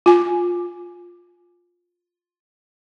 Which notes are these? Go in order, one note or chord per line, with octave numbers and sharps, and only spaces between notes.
F4 G#5